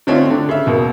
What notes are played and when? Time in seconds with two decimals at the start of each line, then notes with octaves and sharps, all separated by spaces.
0.07 D3 A3 C4 C#4 D#4 F4
0.30 D3 D4
0.49 C#3 E5
0.66 E1 B2 A#3